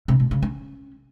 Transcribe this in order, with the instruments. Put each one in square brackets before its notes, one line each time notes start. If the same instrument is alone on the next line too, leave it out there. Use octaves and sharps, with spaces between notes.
[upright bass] C3
B2
C#3
C#4